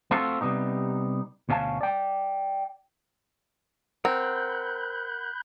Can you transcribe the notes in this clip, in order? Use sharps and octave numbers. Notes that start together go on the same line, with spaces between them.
A3 C4 F4 F#4 A4
C3 G3 B3 D#4
D2 B2 C#4 F5 A5
D5 G5
C4 A#4 F#5 A#5 B5 F#6 G6